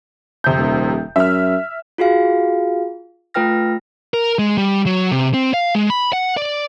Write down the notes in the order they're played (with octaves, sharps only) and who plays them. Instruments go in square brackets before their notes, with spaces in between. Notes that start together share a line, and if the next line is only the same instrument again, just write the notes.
[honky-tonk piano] F2 C3 G6
[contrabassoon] D#1
[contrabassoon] F#2 [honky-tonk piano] E5 F6
[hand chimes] F4 F#4 G#4 F5
A3 F4 B4 G5 F6 A#6
[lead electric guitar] A#4
G#3
G3
F#3
C3
C4
F5
G#3
B5
F#5
D5